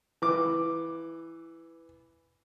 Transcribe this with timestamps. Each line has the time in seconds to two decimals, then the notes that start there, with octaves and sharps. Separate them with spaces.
0.22 E3 D6